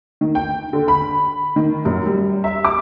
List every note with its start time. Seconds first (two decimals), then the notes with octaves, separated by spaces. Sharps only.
0.21 D#3
0.35 G5
0.73 D3
0.88 B5
1.56 D#3
1.85 F#2
2.06 G3
2.44 E5
2.65 D6